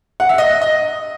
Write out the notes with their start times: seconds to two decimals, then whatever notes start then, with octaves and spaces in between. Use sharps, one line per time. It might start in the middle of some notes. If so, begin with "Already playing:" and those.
0.20 F#5
0.29 E5
0.38 D#5
0.62 D#5